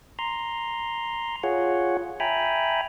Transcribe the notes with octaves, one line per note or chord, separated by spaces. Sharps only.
A#5 C6
F4 G#4 C#5 F#5
E5 G5 G#5 A#5 B5